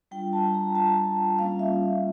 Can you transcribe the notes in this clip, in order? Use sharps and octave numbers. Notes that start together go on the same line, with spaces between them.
G3 D4 F4 G5
A5
A#5
A5
G3 A#3 C#4 F4 F5
E5